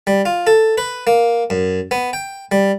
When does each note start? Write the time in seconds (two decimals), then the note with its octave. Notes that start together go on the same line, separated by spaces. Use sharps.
0.07 G3
0.25 F4
0.47 A4
0.78 B4
1.07 A#3
1.50 F#2
1.91 B3
2.13 G5
2.52 G3